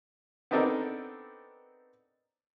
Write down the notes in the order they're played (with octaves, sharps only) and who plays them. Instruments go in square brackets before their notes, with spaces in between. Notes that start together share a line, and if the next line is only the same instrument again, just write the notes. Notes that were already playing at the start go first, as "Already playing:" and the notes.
[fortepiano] B3 C4 D4 D#4 A4 A#4